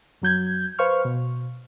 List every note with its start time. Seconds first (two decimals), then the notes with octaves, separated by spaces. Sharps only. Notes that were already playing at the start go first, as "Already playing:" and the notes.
0.22 F#2 F#3 G6 G#6
0.78 B4 C5 F5 C#6 F6
1.05 B2